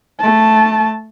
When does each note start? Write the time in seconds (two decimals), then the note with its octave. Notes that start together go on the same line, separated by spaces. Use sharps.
0.20 A3 A5